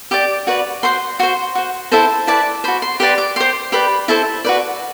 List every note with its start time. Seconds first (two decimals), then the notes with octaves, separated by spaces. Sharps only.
0.11 G4 D5 D6
0.47 F#4 B4 D5
0.83 F#4 C5 C6
1.19 F#4 C5 C6
1.55 F#4 C5
1.92 E4 A4 C5 A5
2.27 E4 B4 D5 A5
2.64 F#4 C5 B5
2.82 C6
3.00 G4 B4 D5 C6
3.18 D6
3.36 G4 C5 C6
3.72 G4 B4 D5 B5
4.08 E4 A4 C5 A5
4.45 F#4 B4 D5